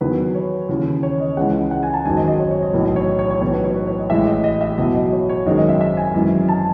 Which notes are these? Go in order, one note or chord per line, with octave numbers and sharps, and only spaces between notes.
E2 D#3 F#3 B4
C#5
D#2 C#3 E3
C#5
D#5
C#2 C#3 E3 G#3 F#5
F#5
G#5
A5
G#1 F#2 D#3 F#3 G#5
D#5
D#5
C#5
C#5
D#5
B1 A2 E3
D#5
C#5
C#5
C#5
B1 A2 E3 C#5
B4
C#5
B4
C#5
D#5
A1 A2 G#3 E5
D#5
D#5
E5
E2 B2 F#3 D#5
D#5
C#5
C#5
G#1 F#2 D#3 G#3 D#5
D#5
E5
E5
G#5
G#1 F#2 E3 G#3
A5